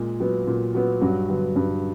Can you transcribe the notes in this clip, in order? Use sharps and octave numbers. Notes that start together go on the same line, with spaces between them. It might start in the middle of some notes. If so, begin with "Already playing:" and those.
Already playing: A#2 G#3
F#3 B3
A#2
F#3 B3
G2 F#3 F#4
D3 F#3 B3
G2